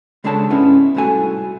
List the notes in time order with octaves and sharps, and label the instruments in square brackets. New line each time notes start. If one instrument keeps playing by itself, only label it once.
[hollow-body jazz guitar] C#3 G#3 D4 A4 C#5 A5
G#2 B3 C#4 D#4 E4
C2 A2 D3 A3 F#4 G#5